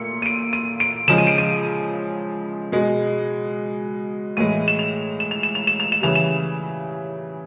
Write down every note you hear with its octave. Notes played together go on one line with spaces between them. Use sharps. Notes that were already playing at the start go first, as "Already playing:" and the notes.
Already playing: A#2 A3 C#7
D#7
D7
D#7
D7
C#3 F3 G#3 E7
D#7
D7
D#7
B2 G#3
A2 E3 G#3 D#7
E7
F7
E7
F7
E7
F7
E7
F7
E7
C#3 E3 G3 F7
E7